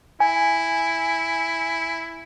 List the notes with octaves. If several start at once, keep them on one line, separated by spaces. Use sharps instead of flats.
E4 G#5